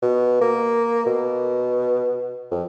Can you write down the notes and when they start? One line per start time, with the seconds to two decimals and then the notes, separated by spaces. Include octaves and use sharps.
0.02 B2
0.41 A#3
1.06 B2
2.51 F2